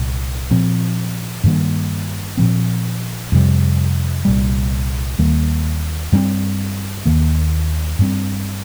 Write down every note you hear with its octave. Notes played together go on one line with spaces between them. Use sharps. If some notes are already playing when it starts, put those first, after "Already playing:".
Already playing: C2 A#2
A#2 F3 C4
G2 D#3 G3 A#3
A#2 F3 C4
F2 C3 G3
C2 A#2 G3
D#2 D#3 G3 A#3
G2 G3 C4
D#2 D#3 A#3
G2 G3 C4